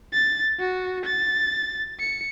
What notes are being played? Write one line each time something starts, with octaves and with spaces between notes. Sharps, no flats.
A6
F#4
A6
C#7